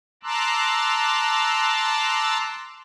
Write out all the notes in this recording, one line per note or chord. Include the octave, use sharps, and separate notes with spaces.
A5 A#5 C6 D6 E6 F#6